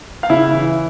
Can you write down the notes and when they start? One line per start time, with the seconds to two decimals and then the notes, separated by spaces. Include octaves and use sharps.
0.23 F5
0.30 C#3 E4 E5
0.53 E3